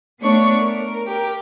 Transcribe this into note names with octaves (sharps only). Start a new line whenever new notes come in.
A3 B3 D4 C#5 C#6
A#4
G4 A#4